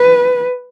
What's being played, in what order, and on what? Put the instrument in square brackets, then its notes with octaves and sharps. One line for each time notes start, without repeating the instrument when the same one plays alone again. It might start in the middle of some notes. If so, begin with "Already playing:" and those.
Already playing: [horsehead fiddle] B4